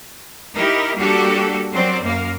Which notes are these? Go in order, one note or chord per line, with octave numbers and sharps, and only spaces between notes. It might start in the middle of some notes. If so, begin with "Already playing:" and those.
D#4 E4 G4 A#4
G3 A#3 D4 F#4 G4 A4
F#3 C4 A#4 C5 D5
F#2 A#3 A#4 F5